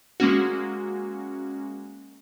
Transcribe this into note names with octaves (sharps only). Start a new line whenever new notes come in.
G#3 A#3 C#4 F#4